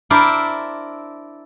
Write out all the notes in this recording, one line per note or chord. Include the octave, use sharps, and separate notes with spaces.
D4 E4 A#4 C5 D5 E5